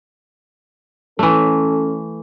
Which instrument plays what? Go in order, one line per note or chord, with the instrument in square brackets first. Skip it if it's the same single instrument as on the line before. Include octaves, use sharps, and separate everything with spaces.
[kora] E3 A3 [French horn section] C#4 A4